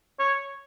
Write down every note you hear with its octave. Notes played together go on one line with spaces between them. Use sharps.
C#5